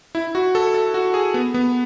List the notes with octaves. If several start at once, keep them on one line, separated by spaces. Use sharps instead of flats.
E4
F#4
A4
A4
F#4
G#4
B3
B3